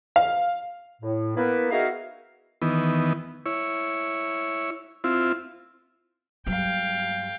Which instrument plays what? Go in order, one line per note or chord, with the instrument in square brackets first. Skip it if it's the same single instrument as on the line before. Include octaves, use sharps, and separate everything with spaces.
[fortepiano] F5
[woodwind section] A2
A#3 B3 E4 B4
D#4 F#4 G#4 A#4 E5 F5
[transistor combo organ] D#3 E3 B3
E4 C#5
C4 E4 F4
[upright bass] G2 F#3 [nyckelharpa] F5 G5